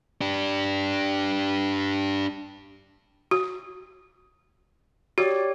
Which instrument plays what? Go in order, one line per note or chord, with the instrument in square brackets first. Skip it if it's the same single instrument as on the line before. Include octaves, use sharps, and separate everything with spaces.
[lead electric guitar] D4 G4
[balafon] F#4
[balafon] F#4 [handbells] G4 C#5 D5